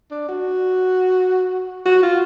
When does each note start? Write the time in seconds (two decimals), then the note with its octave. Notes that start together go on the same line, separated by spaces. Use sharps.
0.11 D4
0.29 F#4
1.85 F#4
2.03 F4